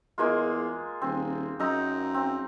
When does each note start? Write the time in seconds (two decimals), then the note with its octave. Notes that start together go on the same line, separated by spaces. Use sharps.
0.18 E2 G#3 A#3 F4
1.02 D#1 C4
1.60 F#2 D#4 A#5 E6
2.14 C4